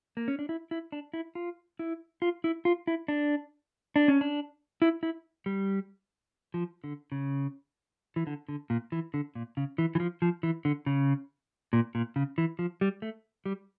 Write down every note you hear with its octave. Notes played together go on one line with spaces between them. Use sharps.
A#3
C#4
D4
E4
E4
D4
E4
F4
E4
F4
E4
F4
E4
D4
D4
C#4
D4
E4
E4
G3
F3
D3
C#3
E3
D3
D3
A#2
E3
D3
A#2
C#3
E3
E3
F3
F3
E3
D3
C#3
A#2
A#2
C#3
E3
F3
G3
A3
G3